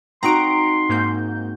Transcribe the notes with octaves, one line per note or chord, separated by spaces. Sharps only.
C4 D#4 F#4 A#5 C6 D7
G#2 A#3 G6